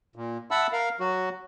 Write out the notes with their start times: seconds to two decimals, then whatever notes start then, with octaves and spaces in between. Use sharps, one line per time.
0.16 A#2
0.51 E5 F#5 A5 B5 E6
0.73 A#4 F5
1.00 F#3 F#4